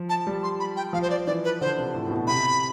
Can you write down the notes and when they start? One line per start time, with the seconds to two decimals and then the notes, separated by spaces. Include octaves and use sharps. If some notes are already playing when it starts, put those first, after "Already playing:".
Already playing: F3
0.09 A5
0.27 G3
0.43 C6
0.60 B5
0.77 G5
0.93 F3 F5
1.02 C5
1.10 D5
1.27 E3 D5
1.44 B4
1.61 D3 C5
1.78 C3
1.94 A2
2.07 A2
2.11 B2
2.27 C3 B5